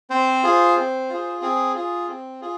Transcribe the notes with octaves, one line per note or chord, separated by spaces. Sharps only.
C4 C5
F4 G#4
C4
F4 G#4
C4 G#4
F4 G#4
C4
F4 G#4